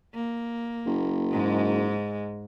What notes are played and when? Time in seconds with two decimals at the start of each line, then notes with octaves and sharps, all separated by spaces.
0.14 A#3
0.86 F#1
1.32 G#2 G#3